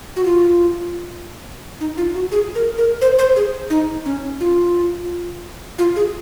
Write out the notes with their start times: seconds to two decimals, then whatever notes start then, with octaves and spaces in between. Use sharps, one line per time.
0.16 F#4
0.25 F4
1.80 D#4
1.97 F4
2.15 F#4
2.32 G#4
2.55 A#4
2.78 A#4
3.01 C5
3.19 C5
3.36 G#4
3.70 D#4
4.05 C#4
4.40 F4
5.78 F4
5.96 G#4